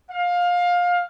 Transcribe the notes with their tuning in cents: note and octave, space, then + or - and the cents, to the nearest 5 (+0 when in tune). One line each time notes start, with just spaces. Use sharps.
F5 +20